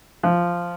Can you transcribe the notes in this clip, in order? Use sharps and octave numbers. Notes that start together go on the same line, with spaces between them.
F3